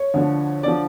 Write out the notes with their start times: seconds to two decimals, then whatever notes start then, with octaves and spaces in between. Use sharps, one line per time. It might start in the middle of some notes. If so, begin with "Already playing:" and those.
Already playing: C#5
0.14 D2 D3 F3
0.63 D3 F3 D5